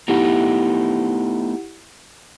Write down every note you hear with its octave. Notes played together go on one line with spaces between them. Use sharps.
A3 B3 D#4 E4 G4 F#5